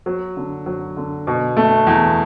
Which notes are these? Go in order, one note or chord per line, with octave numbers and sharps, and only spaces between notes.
F#3
D3
F#3
D3
B2
A3
E2